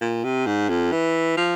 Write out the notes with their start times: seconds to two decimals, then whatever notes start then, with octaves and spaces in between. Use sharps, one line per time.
0.01 A#2
0.24 C3
0.46 G#2
0.69 F2
0.92 E3
1.37 F3